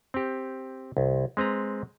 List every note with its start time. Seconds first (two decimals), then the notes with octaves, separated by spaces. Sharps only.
0.14 C4 G4
0.97 C2
1.37 G#3 C4 B4 A#5